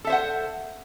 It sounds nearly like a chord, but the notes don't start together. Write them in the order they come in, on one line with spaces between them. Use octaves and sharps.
A4 E5 C5 F#5